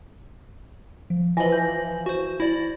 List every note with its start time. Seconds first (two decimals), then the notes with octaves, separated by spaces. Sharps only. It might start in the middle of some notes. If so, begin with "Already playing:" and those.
1.10 F3
1.37 E3 F3 D#5 G#5 A#6 F#7
1.52 G6 A#6
2.06 F#4 C5
2.40 E4 D5 A#6